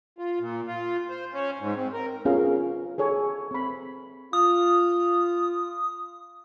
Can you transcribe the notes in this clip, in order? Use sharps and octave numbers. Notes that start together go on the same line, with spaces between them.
F4
A#2
F4
C5
C#4
G#2
C4
A#4
B3 C#4 F4 G#4 A#4 F5
G#4 A4 C#5 G#5
C4 B5
F4 D#6